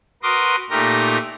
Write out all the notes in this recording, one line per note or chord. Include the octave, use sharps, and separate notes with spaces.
F#4 A#4 B4 C6 D6 D#6
A#2 A3 D#4 G4 A#4 A#6